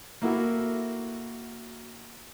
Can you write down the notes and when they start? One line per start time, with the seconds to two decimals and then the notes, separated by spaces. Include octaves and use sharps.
0.22 A#3 E4 F#4 A4